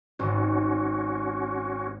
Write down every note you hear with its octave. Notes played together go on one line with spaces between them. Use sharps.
G#1 D#3 C#4 F#4